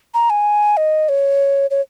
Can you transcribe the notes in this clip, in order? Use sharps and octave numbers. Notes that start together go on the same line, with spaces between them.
A#5
G#5
D#5
C#5
C#5